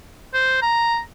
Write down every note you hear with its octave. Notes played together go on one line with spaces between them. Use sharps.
C5
A#5